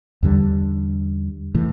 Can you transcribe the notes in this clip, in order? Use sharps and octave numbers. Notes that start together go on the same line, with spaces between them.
E2 D3 G3
A2 E3